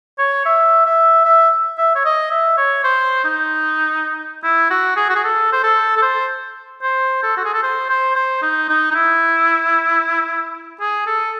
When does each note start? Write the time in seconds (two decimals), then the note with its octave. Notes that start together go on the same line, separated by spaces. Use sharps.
0.18 C#5
0.45 E5
0.86 E5
1.25 E5
1.78 E5
1.96 C#5
2.05 D#5
2.31 E5
2.57 C#5
2.84 C5
3.24 D#4
4.43 E4
4.70 F#4
4.97 G#4
5.09 F#4
5.15 G#4
5.24 A4
5.52 C5
5.63 A4
5.97 A4
6.02 C5
6.82 C5
7.23 A4
7.37 F#4
7.45 G#4
7.54 A4
7.63 C5
7.89 C5
8.16 C5
8.42 D#4
8.69 D#4
8.91 D#4
8.95 E4
10.81 G#4
11.07 A4